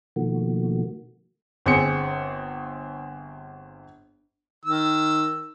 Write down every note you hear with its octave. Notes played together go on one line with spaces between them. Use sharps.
B2 D#3 F3 A3 A#3 F#4
G1 C4 G#4 C#7
D#3 E6